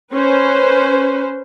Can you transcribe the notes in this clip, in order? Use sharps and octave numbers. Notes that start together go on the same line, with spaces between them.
C#4 B4 C5